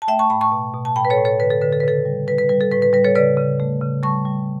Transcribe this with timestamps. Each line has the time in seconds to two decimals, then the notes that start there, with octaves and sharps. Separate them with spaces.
0.02 A5
0.08 A3 E5 G5
0.19 A5 C#6
0.30 A2 G5 B5
0.41 A5 C#6
0.52 B2
0.74 B2
0.85 A5
0.96 A2 G5 B5
1.05 B4
1.10 A4 C#5
1.18 A2
1.25 A4 C#5
1.39 D3 B4
1.50 A4
1.61 D3 B4
1.73 A4
1.80 B4
1.83 C#3 A4
2.05 G3
2.28 G3 B4
2.38 B4
2.49 G3 B4
2.61 A4
2.72 A2 B4
2.82 B4
2.93 G3 B4
3.04 A4 C#5
3.15 C#3 B4 D5
3.37 C#3
3.60 A3
3.81 C#3
4.03 G3 A5 C#6
4.26 G3